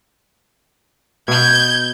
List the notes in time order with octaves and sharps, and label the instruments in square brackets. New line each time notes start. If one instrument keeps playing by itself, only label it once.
[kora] B2 [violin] G6 G#6